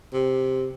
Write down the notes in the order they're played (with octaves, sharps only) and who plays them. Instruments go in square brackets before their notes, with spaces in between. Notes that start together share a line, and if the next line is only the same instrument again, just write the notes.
[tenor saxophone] C3